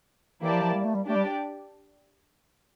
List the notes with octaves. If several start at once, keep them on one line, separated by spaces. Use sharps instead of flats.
E3 A#3 E4 G4 D5 A5
F3
F3
G3
A3
G3
A3 D4 G4 D5
G3